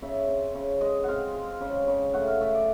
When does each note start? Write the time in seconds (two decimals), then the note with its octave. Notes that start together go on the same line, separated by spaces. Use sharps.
0.02 C#3 E5
0.28 C4
0.55 C#3
0.81 G#3 D#5
1.04 C4 F5 F#5
1.34 G#3
1.61 C#3
1.87 C#3
2.14 A3 F#5
2.27 F5
2.41 A3 E5
2.54 D5